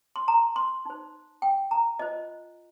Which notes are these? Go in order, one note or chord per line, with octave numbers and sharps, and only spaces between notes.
C6
A#5
C6
D#4 C5
G5
A#5
F4 C5 D#5